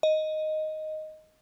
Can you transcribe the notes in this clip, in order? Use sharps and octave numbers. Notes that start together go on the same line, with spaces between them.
D#5